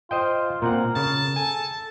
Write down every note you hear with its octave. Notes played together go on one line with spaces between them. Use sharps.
F4 C5 D#5 G5
A#2 C4 A#4 F#5
C#3 A5
A4 G#5